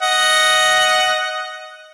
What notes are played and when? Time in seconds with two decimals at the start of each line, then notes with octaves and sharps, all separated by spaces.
0.02 D#5 F#5